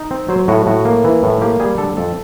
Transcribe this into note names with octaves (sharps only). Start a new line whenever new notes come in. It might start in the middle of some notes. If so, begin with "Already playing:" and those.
Already playing: D#4
C4
F#3 C5
A2 F#4
A2 F#4
A#3
E3
A2
A#3 G4
G3 G#4
D3 A4
F2 A4